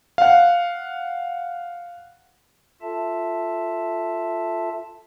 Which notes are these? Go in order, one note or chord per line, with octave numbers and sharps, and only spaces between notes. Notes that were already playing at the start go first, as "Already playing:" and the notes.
F5 F#5
F4 A4 E5 A5